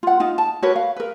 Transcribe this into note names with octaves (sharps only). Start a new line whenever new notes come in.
F4 F#5
D#4 F4
A5
F#4 A#4 B4 C#5
F5
A#4 B4